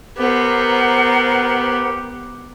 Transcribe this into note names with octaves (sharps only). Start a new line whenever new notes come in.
B3 G4 A#4 C5 F#5